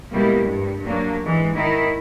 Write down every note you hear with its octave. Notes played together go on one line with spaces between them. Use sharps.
B2 G3 G#3 A#3 E4
G2
F#3 A#3 D4
G#2 E3 G#3
D#3 E4